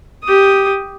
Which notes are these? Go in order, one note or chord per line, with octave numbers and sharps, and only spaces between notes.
G4 D#6